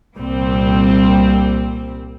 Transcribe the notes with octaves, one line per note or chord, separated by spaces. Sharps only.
C2 A#2 G3 C4